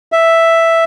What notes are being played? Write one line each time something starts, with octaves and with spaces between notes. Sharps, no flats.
E5